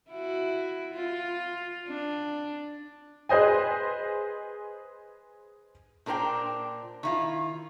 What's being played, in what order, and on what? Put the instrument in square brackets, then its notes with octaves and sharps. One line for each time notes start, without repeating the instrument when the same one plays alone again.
[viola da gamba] E4 F#4
F4
D4
[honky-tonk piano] G#4 B4 C5 D#5 G#5
[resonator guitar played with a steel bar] A#2 D4 A#4 C5 G5
D#3 E4 F4